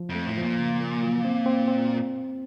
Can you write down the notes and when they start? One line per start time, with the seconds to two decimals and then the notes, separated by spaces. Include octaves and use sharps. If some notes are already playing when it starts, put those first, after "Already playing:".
Already playing: F3
0.10 F2
0.15 A3
0.26 A2
0.38 A#2 F3
0.58 C#3
0.80 A#3
1.02 F#3
1.25 C4
1.46 C4
1.68 C4